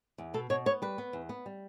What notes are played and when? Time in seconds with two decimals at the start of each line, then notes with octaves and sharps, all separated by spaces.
0.18 E2
0.34 B2 A4
0.50 B2 C#5
0.66 B3 C#5
0.82 G3 B4
0.98 B3
1.13 E2
1.29 B3
1.46 G3